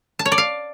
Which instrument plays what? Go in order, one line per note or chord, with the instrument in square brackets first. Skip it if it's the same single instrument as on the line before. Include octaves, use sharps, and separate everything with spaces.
[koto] A5
C#5
D5
F5